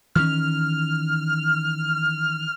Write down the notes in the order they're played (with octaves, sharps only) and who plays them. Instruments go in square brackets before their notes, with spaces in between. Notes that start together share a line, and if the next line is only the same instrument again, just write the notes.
[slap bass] D#3 E3 C#4 [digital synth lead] F6